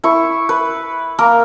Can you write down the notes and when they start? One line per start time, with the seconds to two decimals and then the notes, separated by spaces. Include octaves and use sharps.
0.04 E4 C#6
0.49 B4
1.18 A#3 A#4